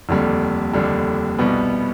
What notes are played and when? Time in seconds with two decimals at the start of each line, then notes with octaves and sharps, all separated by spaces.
0.09 F1 D#2 D3 G3
0.73 F1 D#2 D3 G3
1.39 C2 B2 G3 B3